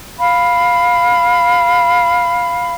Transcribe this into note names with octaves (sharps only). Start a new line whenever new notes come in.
F5 B5